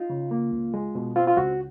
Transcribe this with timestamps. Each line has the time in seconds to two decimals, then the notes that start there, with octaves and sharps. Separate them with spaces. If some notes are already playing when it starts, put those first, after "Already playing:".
Already playing: D#4 F4
0.10 C#3
0.31 A#3
0.52 C#2
0.74 G#3
0.95 B2
1.16 C4 F4
1.27 F4
1.37 C#2 F#4